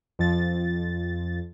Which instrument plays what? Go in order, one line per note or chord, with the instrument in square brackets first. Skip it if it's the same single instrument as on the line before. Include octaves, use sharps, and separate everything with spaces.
[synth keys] F2 F3 A6